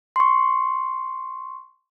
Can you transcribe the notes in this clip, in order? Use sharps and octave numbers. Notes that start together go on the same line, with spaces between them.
C6 C#6